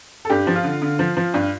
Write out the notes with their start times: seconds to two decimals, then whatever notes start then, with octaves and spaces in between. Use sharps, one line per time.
0.25 A4
0.30 G2 G4
0.47 F3
0.56 F4
0.64 D3
0.82 D3
0.99 F3
1.17 F3
1.34 G2